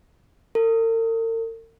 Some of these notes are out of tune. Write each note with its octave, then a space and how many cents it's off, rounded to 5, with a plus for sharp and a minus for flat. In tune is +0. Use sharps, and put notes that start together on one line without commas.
A#4 -45